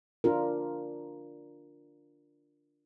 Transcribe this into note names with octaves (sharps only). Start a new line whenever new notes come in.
D4 F4 A#4